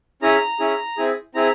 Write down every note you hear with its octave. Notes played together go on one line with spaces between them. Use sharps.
C#4 E4 G#4 A#5
C#4 E4 G#4
C4 E4 G#4
C4 E4 G#4 A#5